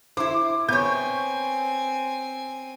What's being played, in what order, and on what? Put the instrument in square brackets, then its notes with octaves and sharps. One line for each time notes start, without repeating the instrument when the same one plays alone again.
[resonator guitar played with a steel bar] E4 C5 [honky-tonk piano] D6
[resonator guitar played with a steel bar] B3 C#5 [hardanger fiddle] C4 G#5 [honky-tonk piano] G6